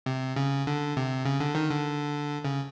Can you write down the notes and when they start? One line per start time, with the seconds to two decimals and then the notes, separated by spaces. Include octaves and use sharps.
0.06 C3
0.36 C#3
0.67 D3
0.97 C3
1.25 C#3
1.40 D3
1.55 D#3
1.70 D3
2.45 C#3